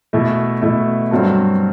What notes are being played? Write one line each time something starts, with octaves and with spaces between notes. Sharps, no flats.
B2 A3 E4
B2 A3 E4
G2 F#3 C4 F#4 A4